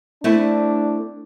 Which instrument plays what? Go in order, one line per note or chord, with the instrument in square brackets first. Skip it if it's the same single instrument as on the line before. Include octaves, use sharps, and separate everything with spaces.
[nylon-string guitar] A3 C4 E4 [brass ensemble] D4